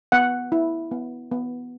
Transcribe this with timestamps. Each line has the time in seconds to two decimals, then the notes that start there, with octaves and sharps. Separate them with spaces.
0.12 B3 F#5
0.52 E4
0.91 B3
1.32 B3